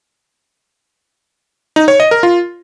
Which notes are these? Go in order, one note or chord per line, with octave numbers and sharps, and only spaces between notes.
D#4
C#5
D#5
A#4
F4